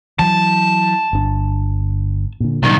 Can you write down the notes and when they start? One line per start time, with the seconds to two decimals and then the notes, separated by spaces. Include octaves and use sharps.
0.19 E3 F#3 A5
1.13 G1 D4
2.40 A#2 D3
2.63 C2 A#2 D#3 F#3